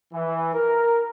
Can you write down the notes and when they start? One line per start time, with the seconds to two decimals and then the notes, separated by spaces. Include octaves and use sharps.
0.13 E3
0.54 A#4